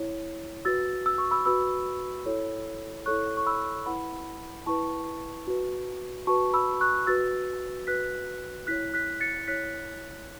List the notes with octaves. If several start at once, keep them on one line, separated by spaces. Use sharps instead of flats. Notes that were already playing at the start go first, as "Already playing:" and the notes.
Already playing: E4 C#5
F#4 B4 E6 A6
E6
C#6
B5 E6
F#4 B4 B5 E6
E4 A4 C#5
E4 A4 C#5 C#6 F#6
C#6
B5 E6
E4 B4 F#5 B5
E4 B4 A5 C#6
F#4 B4
F#4 B4 A5 C#6
B5 E6
C#6 F#6
F#4 B4 E6 A6
F#4 B4 F#6 B6
E4 C#5 F#6 B6
F#6 B6
A6 C#7
E4 C#5 F#6 B6